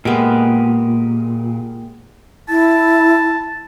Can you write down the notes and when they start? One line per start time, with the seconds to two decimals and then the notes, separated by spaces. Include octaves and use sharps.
0.05 A#2 G#3 A#3 B3 G4 G#4
2.49 E4 A5